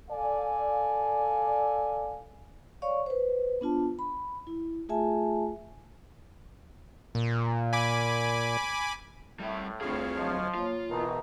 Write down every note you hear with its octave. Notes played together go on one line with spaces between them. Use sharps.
A4 D5 F5 G#5
C#5 D5 F5 C#6
B4 C5
B3 D4 F4 A5
B5
E4
A3 F4 G#4 E5 G#5 A5
A#2
G#5 B5 D6
A2 G3 E5
D2 C4 D4 F4 G#4 C#5 F5 C#6
F3 F#3 D#5
A#3 F4 C#5
G#1 B2 E3 D#4 A#4 A5 A#5